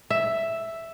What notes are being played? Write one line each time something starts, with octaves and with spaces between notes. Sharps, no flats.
E5